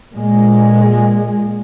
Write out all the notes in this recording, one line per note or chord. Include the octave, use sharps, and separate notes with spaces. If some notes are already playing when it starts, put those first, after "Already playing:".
A#2 G#3